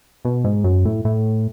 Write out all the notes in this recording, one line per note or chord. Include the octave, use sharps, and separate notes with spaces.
B2
G#2
F#2
A2
A2